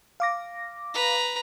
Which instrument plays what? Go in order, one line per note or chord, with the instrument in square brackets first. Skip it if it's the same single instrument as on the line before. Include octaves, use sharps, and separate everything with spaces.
[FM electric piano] F5 D6 A#6
[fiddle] B4 A#5